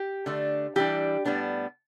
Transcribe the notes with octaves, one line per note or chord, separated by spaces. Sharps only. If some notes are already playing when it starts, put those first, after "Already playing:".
Already playing: G4
D3 A3 D4
E3 G3 D4 G4
A2 G3 B3 D4